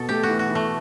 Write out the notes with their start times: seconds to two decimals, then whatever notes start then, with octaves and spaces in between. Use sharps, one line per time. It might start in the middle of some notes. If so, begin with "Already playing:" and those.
Already playing: B2 A4
0.09 A3 G4
0.23 F#4
0.29 E3
0.39 F#4
0.49 E3
0.55 A3